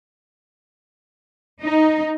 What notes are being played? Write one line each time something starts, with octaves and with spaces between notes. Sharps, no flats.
D#4